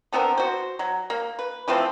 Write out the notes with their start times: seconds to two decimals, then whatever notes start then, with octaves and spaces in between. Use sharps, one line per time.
0.13 D3 B3 C4 A#4
0.37 F#4 C5
0.79 F#3
1.10 A#3
1.39 B4
1.68 E3 F3 A3 C4